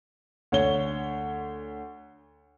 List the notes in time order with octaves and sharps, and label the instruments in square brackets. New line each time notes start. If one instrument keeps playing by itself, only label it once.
[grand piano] D2 C#5 G7